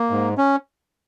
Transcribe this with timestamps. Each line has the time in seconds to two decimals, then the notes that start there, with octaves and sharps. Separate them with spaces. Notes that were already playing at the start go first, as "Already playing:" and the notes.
Already playing: A#3
0.10 G#2
0.38 C#4